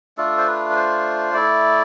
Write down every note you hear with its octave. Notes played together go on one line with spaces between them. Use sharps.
A3 D4 F4 A4
C5
B4
B4
C5
A3 E4 D5